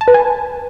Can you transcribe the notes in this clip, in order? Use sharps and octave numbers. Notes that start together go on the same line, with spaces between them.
A5
B4
G#5